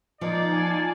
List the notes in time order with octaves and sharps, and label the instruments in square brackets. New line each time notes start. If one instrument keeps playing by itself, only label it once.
[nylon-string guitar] F3 [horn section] A#3 D5 [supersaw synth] D#4
[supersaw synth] G#5 A5